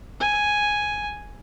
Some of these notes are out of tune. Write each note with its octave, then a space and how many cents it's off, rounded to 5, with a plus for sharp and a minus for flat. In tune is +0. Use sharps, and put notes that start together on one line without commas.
G#5 +0